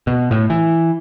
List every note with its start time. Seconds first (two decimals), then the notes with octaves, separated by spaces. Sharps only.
0.07 B2
0.31 A2
0.50 E3